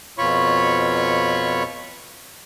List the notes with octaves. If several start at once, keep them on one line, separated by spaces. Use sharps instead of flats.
F2 B2 F4 C#5 B5 C#6